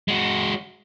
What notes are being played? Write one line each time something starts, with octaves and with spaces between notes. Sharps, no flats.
G#3 F#4